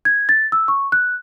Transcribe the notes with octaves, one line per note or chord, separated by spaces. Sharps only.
G#6
A6
E6
C#6
F#6